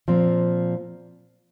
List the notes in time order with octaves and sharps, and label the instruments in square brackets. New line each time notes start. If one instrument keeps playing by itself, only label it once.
[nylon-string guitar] A#2 F3 C4